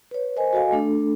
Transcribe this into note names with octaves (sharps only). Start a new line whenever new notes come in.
B4 C#5
A#4 C5 D#5 G#5
F#4 A4 D#5 F5 G#5
A3 D4 A4